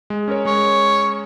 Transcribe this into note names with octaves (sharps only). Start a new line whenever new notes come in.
G#3
C#4 A#4 C#5
G#3 C#5